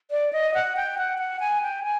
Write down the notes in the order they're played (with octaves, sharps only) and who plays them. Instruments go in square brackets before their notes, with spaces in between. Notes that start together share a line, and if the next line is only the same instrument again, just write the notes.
[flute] D5
D#5
F#5
G5
F#5
F#5
G#5
G5
G#5